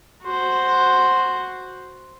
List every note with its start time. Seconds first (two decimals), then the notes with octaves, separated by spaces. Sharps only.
0.24 F#4 C5